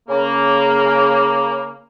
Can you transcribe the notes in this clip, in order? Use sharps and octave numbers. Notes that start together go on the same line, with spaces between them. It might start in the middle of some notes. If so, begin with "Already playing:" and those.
C#3 A#3